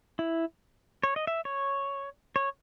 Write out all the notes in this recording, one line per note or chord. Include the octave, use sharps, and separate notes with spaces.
E4
C#5
D#5
E5
C#5
C#5